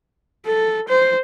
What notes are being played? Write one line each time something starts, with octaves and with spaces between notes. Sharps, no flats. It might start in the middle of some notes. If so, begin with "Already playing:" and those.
A4
C5